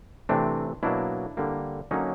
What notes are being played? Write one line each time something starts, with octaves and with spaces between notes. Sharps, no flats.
C3 E3 A3 C4 D4
B2 F#3 A#3 D4 E4
D3 G3 A#3
D3 F#3 A#3 C#4 D#4